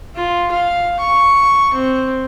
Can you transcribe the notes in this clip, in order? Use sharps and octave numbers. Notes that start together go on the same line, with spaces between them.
F4
F5
C#6
C4